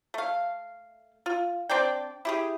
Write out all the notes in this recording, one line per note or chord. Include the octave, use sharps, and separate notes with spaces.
A3 F5
F4
C4 D4 D5 G5
E4 G4 G#4